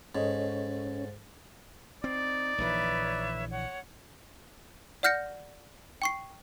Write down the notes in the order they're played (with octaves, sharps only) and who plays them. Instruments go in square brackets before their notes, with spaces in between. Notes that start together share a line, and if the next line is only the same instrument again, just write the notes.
[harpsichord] G#2 [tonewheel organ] C#4 [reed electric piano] A4 C#5 D#5
[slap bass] C4 [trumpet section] D#4 D5
[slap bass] A#1 D3 E3 [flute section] B4 C#5 E5
[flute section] C#5 F#5
[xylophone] D5 F#5 F6 G6 A#6 C#7
G5 C#6 C7